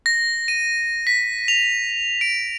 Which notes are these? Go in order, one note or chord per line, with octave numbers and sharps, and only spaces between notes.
A#6
D#7
B6
F7
D7